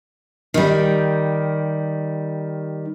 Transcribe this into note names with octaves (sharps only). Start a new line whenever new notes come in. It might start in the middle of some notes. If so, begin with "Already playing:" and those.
D#3 G3